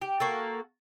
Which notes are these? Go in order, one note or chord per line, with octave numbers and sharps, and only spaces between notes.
G4
A#3 F#4 A4